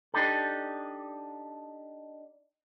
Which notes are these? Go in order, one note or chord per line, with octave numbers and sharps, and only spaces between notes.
D4 D#4 G4 A4